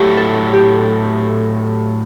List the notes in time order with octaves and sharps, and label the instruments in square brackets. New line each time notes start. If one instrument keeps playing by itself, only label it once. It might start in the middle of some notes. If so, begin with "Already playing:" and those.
Already playing: [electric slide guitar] A2 F#3 A3 [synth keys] G4
[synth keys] A4
G4